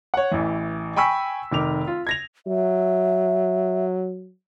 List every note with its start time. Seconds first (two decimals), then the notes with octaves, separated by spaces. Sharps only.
0.14 C#5 F#5
0.31 A1 E3
0.96 G5 G#5 B5 C#6 E6 B6
1.52 F1 D#3 D6 F7
1.87 F4
2.07 G#6 A#6 F7
2.46 F#3 E5